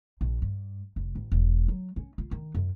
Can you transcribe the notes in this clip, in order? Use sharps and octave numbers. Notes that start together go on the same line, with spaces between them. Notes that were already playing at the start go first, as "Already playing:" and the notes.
A#1
G2
F1
A1
E1
F#3
C#4
F4
D#3
F#2